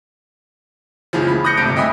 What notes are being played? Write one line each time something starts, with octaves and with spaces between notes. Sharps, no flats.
F#1 C#2 C#3 E3 F3
B5
D#6 F#6 G6 A#6 C#7
G#1 D2 G2 C3 G6 D7
D#5 E5 G5 G#5 B5 D#6